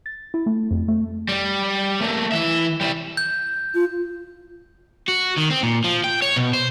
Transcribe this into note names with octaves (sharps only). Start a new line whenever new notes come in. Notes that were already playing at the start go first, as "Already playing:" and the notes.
A6
E4
A3
F2
A3
G3
A3 A#3
E3 E5
G3 E4
G6
F4
F#4
D#3
C4
A#2
F3
G5
C#5
B2
C5